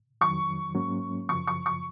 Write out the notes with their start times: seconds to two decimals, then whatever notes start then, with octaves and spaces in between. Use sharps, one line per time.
0.21 F2 D#3 F#3 C#6
0.75 G#2 F#3 A#3 C#4
1.29 F#2 C#3 F3 C#6
1.47 C#6
1.66 C#6